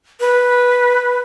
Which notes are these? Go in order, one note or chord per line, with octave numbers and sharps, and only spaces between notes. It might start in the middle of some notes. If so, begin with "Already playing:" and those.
B4